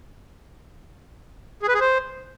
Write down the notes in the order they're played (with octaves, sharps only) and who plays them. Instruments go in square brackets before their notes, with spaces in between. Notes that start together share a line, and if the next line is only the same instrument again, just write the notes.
[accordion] G#4
B4
G#4
C5